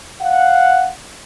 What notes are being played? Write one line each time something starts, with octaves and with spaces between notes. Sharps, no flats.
F5 F#5